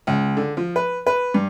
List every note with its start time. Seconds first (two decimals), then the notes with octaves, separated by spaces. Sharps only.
0.07 C#2
0.37 D3
0.57 F3
0.76 B4
1.07 B4
1.34 G2